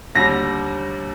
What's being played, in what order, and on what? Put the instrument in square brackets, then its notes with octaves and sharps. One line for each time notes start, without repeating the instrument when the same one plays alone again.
[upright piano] D#2 D3 G3 A#6